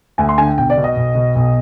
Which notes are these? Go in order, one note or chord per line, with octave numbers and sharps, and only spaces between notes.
D2 G#5
C6
D3 G#5
G5
B1 G5
D5
B2
D#5
B1
B2
B1